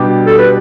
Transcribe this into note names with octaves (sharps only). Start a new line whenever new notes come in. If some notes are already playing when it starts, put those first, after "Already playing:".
Already playing: B2 G3 D4 G4
A4
B4